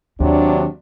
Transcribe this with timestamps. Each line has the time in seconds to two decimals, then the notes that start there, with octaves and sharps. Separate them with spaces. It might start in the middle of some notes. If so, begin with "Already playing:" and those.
0.20 D#2 C3 F#3 D4